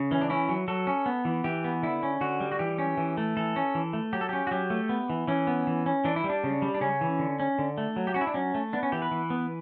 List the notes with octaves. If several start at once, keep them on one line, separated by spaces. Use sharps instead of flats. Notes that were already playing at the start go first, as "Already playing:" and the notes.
Already playing: C#3
E3 C#4
D4
C#4 E4
F#3
F#3 A4
C#4
B3
E3
E3 G4
B3
D3 E4
C#4
D3 F#4
G3
F#4
E3 G4
C#4
E3
A3
E3 A4
C#4
E3
A3
F#3 G4
A4
C#4 G4
F#4
F#3 G4
A3
B3
E3
E3 C#4
B3
E3
C#4
E3 D4
E4
G3
D4
C#3
G3
D4
C#3 C#4
E3
D3
C#4
D3
A3
F#3
G4
C#4 F#4
E4
D4
F#3 C#4
A3
B3 D4
C#4
E3 G4
B4
E3
B3